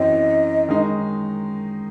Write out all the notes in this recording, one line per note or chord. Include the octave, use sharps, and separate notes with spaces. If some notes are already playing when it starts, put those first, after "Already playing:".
Already playing: F#2 E3 C4 D#5
D#3 G#3 D#4